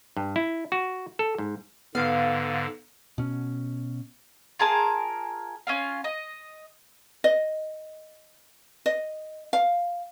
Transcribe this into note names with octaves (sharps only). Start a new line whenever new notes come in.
G2
E4
F#4
A4
G#2
G#2 D3 B3 F5
B2 C#4
F4 G#4 A#4 A5
C#4 F4 F5
D#5
D#5
D#5
F5